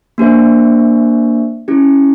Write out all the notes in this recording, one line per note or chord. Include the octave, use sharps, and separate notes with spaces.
A#3 D4 G4 C5 E5
C#4 E4 G4